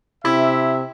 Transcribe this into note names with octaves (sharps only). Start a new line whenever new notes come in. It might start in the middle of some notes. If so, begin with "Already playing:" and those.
C3 E4 E5